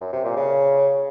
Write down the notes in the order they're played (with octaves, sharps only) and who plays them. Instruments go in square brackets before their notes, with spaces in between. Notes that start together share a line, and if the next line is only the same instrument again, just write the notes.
[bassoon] F#2
C3
A#2
C#3